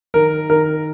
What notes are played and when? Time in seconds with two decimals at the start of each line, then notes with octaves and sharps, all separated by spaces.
0.14 D#3 A#4
0.50 D#3 A#4